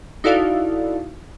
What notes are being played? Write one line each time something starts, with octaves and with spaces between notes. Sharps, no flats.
D#4 E4 F#4 A4 D5 F5